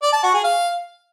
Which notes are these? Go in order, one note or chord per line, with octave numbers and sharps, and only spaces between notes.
D5
A5
F#4
G#4
F5